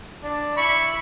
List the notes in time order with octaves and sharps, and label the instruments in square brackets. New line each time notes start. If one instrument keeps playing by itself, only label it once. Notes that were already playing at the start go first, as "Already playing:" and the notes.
[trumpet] D4
[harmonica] E4 B5 [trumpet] C#6